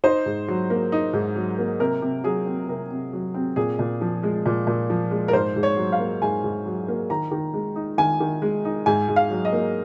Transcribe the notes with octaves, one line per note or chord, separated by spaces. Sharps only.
D#4 C5
G#2
F#3
A#3
D#4
G#2
F#3
A#3
C3 A#4
C3
F#3 G#4
C4
C3 A#4
C3
F#3
C4
A#2 G#4
A#2
F3
G#3
A#2
A#2
F3
G#3
A#4
G#2 C5
G#2
C#5
F#3
F5
A#3
G#2 G#5
G#2
F#3
A#3
D#3 A#5
D#3
G#3
D#4
D#3 G#5
D#3
G#3
D#4
G#2 G#5
G#2
F5
F#3
D#5
A#3